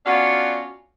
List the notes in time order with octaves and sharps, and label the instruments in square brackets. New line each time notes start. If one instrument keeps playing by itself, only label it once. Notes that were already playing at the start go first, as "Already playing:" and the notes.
[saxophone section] B3 C#4 D4 F4 F#4 F5